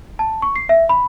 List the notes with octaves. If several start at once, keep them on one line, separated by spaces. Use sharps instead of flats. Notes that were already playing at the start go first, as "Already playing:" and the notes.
A5
C#6
C7
E5
B5